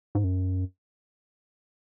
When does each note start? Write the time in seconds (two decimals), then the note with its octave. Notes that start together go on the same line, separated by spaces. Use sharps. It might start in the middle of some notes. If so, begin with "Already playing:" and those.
0.15 G#2
0.24 F#2